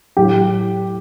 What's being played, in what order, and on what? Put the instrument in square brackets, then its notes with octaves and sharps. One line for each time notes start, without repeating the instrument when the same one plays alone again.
[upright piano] A2 F#3 G4